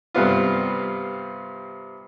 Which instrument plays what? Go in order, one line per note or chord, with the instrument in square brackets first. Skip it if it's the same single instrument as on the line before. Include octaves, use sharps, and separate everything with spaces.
[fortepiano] G2 C3 B3 F4